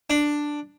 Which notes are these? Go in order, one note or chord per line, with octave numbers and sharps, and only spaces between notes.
D4